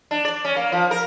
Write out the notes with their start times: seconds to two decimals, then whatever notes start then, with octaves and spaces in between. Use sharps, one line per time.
0.11 D4
0.25 D5
0.45 C#4
0.56 A#3
0.72 F3
0.91 A#4